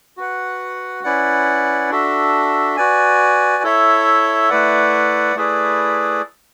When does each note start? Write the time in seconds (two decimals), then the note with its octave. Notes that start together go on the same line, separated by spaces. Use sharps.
0.17 F#4 B4 F#5
1.04 C#4 E4 B4 D5 F#5
1.90 D4 F#4 A4 E5
2.77 F#4 B4 D5 G#5
3.63 E4 A4 C#5 E5
4.50 A3 E4 B4 D5 F#5
5.35 A3 E4 G#4 B4 D5